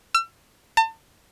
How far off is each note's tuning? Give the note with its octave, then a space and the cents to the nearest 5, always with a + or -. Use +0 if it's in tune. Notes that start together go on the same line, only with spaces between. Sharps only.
E6 +40
A5 +35